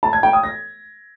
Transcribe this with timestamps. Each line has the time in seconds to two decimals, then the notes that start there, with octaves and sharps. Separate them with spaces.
0.03 A5
0.13 G#6
0.23 G5
0.33 D#6
0.43 A#6